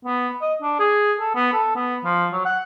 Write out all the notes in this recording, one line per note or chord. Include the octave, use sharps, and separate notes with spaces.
B3
D#5
D4
G#4
A4
B3
A4
B3
F3
F#3
F#5